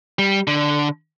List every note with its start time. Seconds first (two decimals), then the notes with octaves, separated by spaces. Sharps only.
0.19 G3
0.47 D3